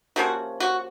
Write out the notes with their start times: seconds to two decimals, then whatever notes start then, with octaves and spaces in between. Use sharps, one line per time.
0.16 C3 F3 A#3 C#4 F#4
0.60 F#4